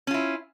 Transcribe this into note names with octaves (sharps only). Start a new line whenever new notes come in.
C#4 E4 F4